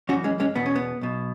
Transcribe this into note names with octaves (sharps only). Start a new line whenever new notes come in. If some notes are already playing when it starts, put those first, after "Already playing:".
F#2 E3 C#4 F#4
G#3 C#4
G#3 C#4
E2 B2 B3
C#4
B3
B1 B2